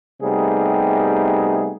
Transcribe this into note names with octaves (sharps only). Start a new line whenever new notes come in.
C3 G3 A3 B3 D#4 G#4